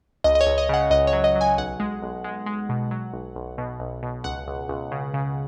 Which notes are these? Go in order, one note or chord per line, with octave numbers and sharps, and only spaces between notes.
C#2 D#5
D#5
C#5
C#2
D#5
C#3 F#5
C#2 D#5
C#5
F#3
D#5
F#3
G#5
B1 F#5
G#3
B1
G#3
G#3
B2
F#3
B1
B1
B2
B1
B2
C#2 F#5
C#2
C#2
C#3
C#3